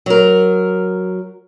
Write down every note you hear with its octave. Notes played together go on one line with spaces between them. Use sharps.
F#3 A#4